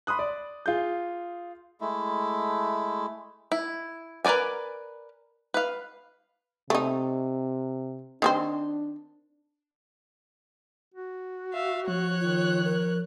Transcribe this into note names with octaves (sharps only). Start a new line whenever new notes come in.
B5 C6 D#6 F#6
D5
F4 G#4 G6
G#3 A3 E4
E4
A#4 B4 C#5 D5 G#5
B4 F5
C3 A3 D#4
D#3 C4 D4 C5
F#4
E5 F5
F3 C#5 F#6
D#3 F4
A#4